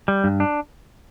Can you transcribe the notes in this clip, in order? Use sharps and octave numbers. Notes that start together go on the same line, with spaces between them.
G3
G2
D4